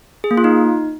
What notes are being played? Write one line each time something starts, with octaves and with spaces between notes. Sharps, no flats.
G#4
A#3
F4
D#4